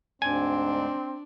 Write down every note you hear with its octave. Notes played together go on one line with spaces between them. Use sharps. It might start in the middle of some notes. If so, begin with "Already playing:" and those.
D2 G#2 C4 D4 G#5